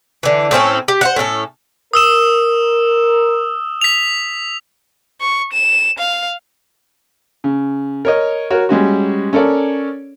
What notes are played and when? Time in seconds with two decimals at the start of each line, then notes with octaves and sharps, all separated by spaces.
0.23 D3 E3
0.51 A2 C4 C#4 A4
0.88 G4
1.01 C5 F5 F#5
1.16 A2 C#4 F4 A4
1.93 A#4 D#6 E6 E7
3.81 B6 F7
5.21 C#6
5.53 E7
5.99 F5
7.44 C#3
8.05 A#4 C#5 D#5
8.51 F#4 A#4 C#5
8.69 G3 G#3 C#4 F#4
9.33 C#4 A4 A#4 C#5 D5